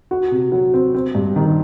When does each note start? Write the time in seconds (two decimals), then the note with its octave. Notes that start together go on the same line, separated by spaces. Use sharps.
0.11 F#4
0.31 C3
0.52 F#3
0.74 C4
0.94 C4
1.15 G2
1.36 D#3